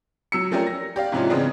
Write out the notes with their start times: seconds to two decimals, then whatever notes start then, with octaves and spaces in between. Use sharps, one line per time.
0.32 F#3 E6 C#7
0.51 F3 A3 C#4 G4 A#4 D5
0.67 A#6
0.96 G4 D5 F5
1.12 G#2 C3 F3 C#4 E4 F4
1.30 C#3 E3 G#3 B3 C4 D4